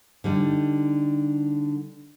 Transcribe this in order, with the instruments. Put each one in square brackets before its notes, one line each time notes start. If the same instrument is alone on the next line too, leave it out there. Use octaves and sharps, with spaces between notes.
[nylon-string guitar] D3 G3 D#4